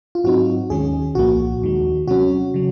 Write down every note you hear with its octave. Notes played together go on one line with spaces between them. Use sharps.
F4
G#2 F#3 C4 D#4 F#4
D#2 D#3 G#3 C#4 G#4
C2 A#2 F3 A#3 F#4
D#2 D#3 G#3
C3 F#3 C#4 F#4
C#3 F#3